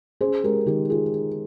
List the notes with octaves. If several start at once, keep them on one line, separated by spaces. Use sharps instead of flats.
C#4 G#4 C5
G#3 G4 A#4
D#3 G4
F4 G#4